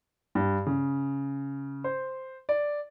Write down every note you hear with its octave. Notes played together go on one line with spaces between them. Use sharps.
G2
C#3
C5
D5